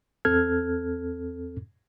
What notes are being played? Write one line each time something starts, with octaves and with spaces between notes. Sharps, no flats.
E2 C4 A4 F6 G#6